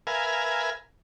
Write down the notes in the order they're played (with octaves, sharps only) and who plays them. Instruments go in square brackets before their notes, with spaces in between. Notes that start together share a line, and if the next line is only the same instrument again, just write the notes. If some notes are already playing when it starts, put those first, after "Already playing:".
[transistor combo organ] A#4 B4 E5 F5 G#5